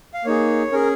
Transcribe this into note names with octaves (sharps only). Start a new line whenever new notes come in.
F5
A#3 D#4 G#4 C#5
C#4 G#4 A#4